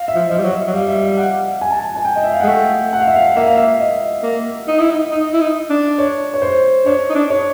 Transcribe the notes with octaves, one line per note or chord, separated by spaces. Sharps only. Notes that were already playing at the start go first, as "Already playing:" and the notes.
Already playing: F5
E5
F3
F3 D#5
G3
F#3
E5
F#3
G3 F5
E5
F5
F#5
G#5
A5
G#5
G#5
G5
D#5
E5
F5
F#5
G#3
A3 G5
F#5
F5
E5
F5
A#3 E5
F5
E5
D#5
A#3
D#4
E4
D#4
D#4
E4
D#4
D4
C#5
C#5
C5
D4 C#5
D#4
D4
C#5